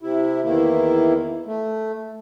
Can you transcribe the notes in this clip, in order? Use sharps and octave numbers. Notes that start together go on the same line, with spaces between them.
C3 E4
E2 D#3 A#3 E4
A3